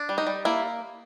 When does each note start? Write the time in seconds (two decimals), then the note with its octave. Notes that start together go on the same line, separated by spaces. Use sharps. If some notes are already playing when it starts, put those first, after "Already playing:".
Already playing: D4
0.09 G3
0.18 D#4
0.27 G3
0.45 A#3 E4